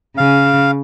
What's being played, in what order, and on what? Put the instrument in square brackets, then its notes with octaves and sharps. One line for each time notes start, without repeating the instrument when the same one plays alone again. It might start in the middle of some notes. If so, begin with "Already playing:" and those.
[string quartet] C#3 [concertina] F5